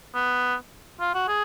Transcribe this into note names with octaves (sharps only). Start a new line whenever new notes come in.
B3
F4
F#4
G#4